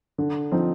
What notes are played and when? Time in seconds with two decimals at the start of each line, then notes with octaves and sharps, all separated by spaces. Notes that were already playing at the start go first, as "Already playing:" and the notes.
0.18 D3
0.51 F3 C4 D#4